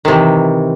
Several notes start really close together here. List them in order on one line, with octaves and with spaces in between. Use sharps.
D#3 C3 E3